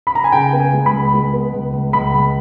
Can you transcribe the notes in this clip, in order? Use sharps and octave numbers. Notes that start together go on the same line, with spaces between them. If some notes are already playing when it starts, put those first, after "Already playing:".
B5
A#5
G#5
C#3 G5
B3
G#5
G#3
B5
C#2
G#3
B3
C#2
C#2
C#2 B5
C#2